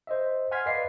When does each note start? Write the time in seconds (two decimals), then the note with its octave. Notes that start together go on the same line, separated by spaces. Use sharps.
0.07 C5 D#5 E5
0.51 F#5 G#5 C6 F6 G#6 B6
0.66 B4 D5 D#5 F5 C7